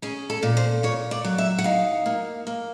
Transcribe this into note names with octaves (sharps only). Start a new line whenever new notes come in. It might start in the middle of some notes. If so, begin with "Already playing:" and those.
C#4 G#4
A4
A#2
C5
A#2 C#5
D5
F#3
E5
F#5
D#4 F5
A#3
A#3